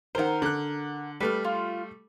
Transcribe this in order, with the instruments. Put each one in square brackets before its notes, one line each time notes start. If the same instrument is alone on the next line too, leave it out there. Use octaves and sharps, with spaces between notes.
[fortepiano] D#3 C5 [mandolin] A#4 F#5
[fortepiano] D3 F#6
[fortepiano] G3 A3 [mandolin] B4 F6
[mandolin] F4